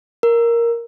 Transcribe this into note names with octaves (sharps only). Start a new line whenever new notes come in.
A#4